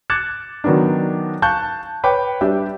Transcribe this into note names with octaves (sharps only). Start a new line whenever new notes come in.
D6 F#6 G#6 A6 C#7 E7
D#3 F#3 B3 C#4 D4
F5 A5 C#6 F#6 G6
B4 C#5 G5 D6
G3 D4 G4 B4 E5